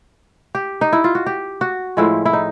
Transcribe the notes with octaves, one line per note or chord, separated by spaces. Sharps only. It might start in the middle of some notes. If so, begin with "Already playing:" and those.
G4
D#4
E4
F4
F#4
G4
F#4
A2 F3 G#3 E4
E4
D#4